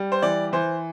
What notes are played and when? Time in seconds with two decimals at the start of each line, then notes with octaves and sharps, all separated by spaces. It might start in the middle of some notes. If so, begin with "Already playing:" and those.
Already playing: G3
0.12 C5
0.22 E3 D5
0.52 E3 C5